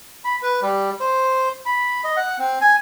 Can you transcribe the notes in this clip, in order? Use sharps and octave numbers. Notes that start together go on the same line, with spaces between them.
B5
B4
G3
C5
B5
D#5
F#5
C4
G#5